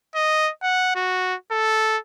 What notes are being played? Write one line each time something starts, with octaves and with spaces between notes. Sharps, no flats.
D#5
F#5
F#4
A4